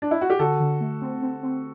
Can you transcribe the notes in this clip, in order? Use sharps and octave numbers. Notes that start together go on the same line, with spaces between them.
D4
E4
F#4
G4
D3 F#4 A4
D3
A3
C4
C4
C4